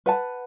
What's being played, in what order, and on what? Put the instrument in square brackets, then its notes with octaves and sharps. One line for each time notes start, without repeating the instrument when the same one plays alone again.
[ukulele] B4 F#5 A5